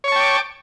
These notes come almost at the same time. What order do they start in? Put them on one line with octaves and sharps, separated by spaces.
C#5 C#6 A5 G5 D6